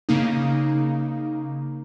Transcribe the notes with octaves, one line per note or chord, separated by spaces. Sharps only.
C#3 A#3 D#4